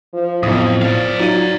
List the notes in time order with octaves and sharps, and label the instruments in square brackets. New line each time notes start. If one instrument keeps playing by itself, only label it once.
[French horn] F3
[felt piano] B1 D#6 [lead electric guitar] F2 [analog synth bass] A2 [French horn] F3
[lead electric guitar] D5 F5
[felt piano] F#3 F4 D#7 [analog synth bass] D#4